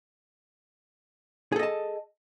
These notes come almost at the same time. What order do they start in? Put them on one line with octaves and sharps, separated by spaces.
G#4 A4 D#5 A5